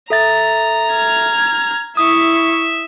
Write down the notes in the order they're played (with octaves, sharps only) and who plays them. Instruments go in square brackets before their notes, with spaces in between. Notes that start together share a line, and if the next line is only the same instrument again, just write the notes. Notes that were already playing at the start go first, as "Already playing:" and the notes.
[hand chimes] A4 E5 A6 [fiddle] A#5
[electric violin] F6 G#6
[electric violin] E4 C#6 [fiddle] E5 [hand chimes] D#6